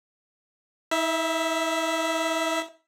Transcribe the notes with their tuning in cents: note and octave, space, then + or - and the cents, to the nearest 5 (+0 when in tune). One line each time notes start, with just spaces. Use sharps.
E4 -45 E5 +5